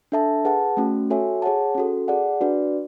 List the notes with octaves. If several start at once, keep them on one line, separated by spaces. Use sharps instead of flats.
D4 A4 E5 A5
G#4 B4 F#5 A5
A3 C#4 F#4
F#4 A4 C#5 E5 G#5
G#4 C#5 F#5 A5
C#4 F#4 A4
G#4 D5 F#5 A5
D4 F#4 B4 D5